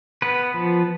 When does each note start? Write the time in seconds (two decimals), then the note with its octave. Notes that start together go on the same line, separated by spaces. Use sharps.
0.22 B3 B4
0.54 F3